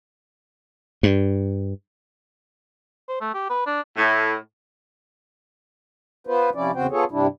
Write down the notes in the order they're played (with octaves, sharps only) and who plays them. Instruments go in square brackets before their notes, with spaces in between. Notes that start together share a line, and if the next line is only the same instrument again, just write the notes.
[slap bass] G2
[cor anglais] C5
A3
G4
B4
D4
[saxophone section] A2
[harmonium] B3 F4 B4 C5
C3 F3 C#4 E4 D5
E2 C#3 C4 F#4 C5 G5
B3 F4 G#4 A4 C#5
G2 C3 G3 D4 E4